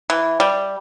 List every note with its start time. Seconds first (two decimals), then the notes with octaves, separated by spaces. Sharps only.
0.10 E3
0.40 G3